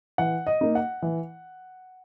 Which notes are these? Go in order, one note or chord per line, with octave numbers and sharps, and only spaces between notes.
E3 F#5
D#5
A#3 D#4
F#5
E3